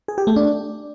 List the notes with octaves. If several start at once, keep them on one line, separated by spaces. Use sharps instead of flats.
G#4
G4
A3
D4